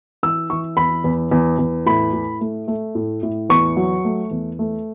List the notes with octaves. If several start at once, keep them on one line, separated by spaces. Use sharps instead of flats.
E3 E6
E3 C#6
E2 B5
E2
E2
E2
A2 B5
A2
A3
A3
A2
A2
E2 C#6
F#3
A3
E2
A3